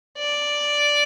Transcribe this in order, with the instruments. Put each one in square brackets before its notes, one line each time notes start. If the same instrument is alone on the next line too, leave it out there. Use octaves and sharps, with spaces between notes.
[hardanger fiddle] D5